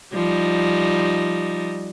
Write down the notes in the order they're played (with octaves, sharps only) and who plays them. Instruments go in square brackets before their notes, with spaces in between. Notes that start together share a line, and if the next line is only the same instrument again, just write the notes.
[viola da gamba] F3 G3 D#4